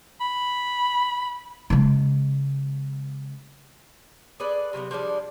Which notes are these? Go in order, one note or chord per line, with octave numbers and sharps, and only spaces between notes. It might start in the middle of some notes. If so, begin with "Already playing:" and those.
B5
C#3 G#3
G#4 A4 B4 D5
C3 F#3 G3 B3
F3 G3 G#3 D4